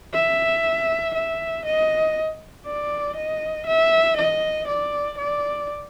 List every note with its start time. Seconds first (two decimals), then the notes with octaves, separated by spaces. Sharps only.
0.14 E5
1.15 E5
1.65 D#5
2.66 D5
3.16 D#5
3.67 E5
4.17 D#5
4.68 D5
5.18 D5